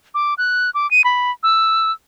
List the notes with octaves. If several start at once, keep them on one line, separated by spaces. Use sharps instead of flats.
D6
F#6
D6
D#7
B5
E6